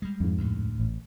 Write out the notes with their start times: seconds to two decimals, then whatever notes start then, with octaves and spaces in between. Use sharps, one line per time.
0.02 G3 G#3
0.20 F2 G#2
0.37 D2 A2
0.79 A1